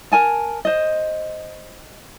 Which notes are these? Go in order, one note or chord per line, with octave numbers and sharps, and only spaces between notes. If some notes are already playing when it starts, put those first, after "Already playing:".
A#4 G#5 A5
C5 D#5